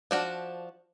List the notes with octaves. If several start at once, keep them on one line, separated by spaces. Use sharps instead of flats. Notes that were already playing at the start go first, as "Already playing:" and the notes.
F3 D4 F#4